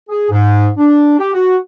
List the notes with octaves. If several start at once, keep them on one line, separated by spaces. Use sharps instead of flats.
G#4
G#2
D4
G4
F#4